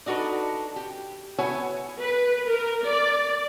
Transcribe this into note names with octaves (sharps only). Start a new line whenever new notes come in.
D4 D#4 F#4 A4 B4
G4
B3 E4 F#4 C#5 G#5
B4
A#4
D5